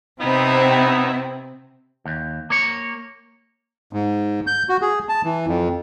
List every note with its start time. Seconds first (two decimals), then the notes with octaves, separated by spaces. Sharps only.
0.21 C3 B3 C4 D#4 E4
2.05 D#2
2.50 A#3 C#5
3.93 G#2
4.47 G6
4.69 F#4
4.82 G#4
5.09 A5
5.24 E3
5.47 F2